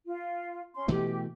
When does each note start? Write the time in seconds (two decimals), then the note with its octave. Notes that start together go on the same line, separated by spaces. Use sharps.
0.06 F4
0.74 C#4 C6
0.88 B2 E3 A3 G4